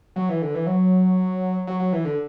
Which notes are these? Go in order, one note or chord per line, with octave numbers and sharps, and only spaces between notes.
F#3
E3
D3
E3
F#3
F#3
F#3
E3
D3